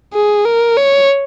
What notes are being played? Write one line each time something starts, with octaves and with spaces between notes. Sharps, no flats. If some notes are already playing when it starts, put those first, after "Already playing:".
G#4
A#4
C#5